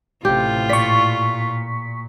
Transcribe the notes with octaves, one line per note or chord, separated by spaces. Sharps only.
A1 A2 C3 F4 G4
A#2 D5 C#6 B6